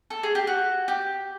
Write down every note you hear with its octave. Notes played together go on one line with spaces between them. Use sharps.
A4
G#4
G4
F#4
G4